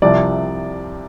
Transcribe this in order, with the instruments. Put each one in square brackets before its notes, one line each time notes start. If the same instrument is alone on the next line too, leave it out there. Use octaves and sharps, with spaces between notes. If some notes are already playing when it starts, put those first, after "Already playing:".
[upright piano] C2 C3 F3 D5